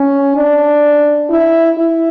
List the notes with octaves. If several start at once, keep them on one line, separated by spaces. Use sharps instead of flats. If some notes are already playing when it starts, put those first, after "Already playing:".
Already playing: C#4
D4
E4
E4